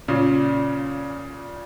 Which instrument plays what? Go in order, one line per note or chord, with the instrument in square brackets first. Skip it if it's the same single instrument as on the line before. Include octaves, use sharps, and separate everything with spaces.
[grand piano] A#2 C#3